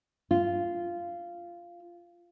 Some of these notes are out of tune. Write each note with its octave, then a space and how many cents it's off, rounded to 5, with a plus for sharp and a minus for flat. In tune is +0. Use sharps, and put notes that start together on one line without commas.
F4 -10